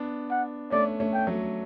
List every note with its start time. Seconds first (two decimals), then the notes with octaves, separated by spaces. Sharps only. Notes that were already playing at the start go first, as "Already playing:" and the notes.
Already playing: B3 D4
0.30 F#5
0.71 A3 C#4 D5
1.00 A3 C#4
1.13 G5
1.27 F#3 A3